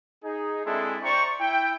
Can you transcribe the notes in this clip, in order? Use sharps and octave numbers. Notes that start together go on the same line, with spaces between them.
D#4 G#4
G#3 C4 D4 E4 G#4 A4
C5 D5 G5 A#5 C#6
E4 G5